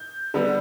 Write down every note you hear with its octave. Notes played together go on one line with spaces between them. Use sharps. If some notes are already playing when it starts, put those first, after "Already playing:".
Already playing: G6
D3 G3 B3